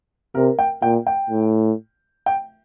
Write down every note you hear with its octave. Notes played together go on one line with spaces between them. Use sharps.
C3 A#4
G5
A#2 G5
G5
A2
G5